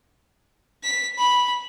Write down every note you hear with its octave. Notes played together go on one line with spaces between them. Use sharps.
B6
B5